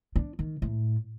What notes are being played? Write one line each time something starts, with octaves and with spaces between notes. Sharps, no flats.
D4
D#3
A2